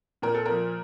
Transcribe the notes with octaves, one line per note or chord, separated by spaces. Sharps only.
A#2 A#4
A4
F3 A#4